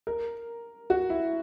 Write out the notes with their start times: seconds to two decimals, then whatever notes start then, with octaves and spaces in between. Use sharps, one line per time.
0.07 A#4
0.90 F#4
1.10 E4